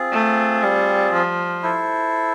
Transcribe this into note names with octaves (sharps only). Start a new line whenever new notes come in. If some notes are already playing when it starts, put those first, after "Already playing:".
Already playing: C4 F4 G#4
A3
G3
F3
E4 A4 C5